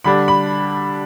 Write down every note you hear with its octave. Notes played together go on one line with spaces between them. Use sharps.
D3 G3 D4 B5
B5